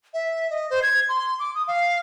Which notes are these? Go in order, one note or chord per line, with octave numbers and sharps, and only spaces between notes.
E5
D#5
C5
G#6
C6
D6
D#6
F5